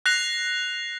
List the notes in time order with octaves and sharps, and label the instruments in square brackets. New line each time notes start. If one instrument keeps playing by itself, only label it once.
[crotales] F#6 A#6 C7 F7